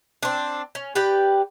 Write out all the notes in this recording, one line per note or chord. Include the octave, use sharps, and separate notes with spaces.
C4 D4
C#4
G4 B4 D5 G5